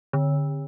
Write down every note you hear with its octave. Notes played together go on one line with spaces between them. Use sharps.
D3